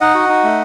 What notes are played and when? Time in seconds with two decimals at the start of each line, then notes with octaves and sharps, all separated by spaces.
0.01 D#4 D#5 F#5
0.15 F#4
0.29 D#4
0.44 A3